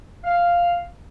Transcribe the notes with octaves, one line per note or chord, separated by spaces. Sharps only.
F5